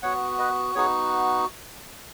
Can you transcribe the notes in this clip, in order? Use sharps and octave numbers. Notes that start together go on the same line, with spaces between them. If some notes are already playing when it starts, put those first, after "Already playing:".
B3 F#4 C#5 F#5
B4 D#5
B3 D#4 F#4 G#4 C#5